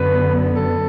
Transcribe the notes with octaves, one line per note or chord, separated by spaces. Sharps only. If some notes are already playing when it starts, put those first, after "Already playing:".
Already playing: F#2 D3 B3 B4
A4